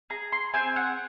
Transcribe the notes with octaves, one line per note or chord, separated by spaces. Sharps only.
G#4 A#5
C6
C4 G#5
F#5